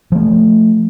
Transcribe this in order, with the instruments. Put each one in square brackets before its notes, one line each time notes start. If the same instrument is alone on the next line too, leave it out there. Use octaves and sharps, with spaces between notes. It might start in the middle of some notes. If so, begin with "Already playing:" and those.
[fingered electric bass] F3 A3